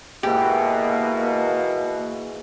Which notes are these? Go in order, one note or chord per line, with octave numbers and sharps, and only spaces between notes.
G#2 B2 E3 A#3 G4